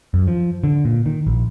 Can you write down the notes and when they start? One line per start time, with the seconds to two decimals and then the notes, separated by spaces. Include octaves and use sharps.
0.14 F#2
0.28 F3
0.64 D3
0.85 A#2
1.06 D#3
1.27 A#1